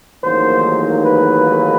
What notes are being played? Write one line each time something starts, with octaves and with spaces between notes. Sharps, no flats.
A1 G#2 D#3 F#3 A#3 C5
B4